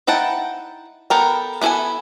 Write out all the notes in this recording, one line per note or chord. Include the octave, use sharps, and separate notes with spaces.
D#4 E4 F#5 G5 A5
B3 A4 A#4 G5
B3 E4 G#4 A4 G#5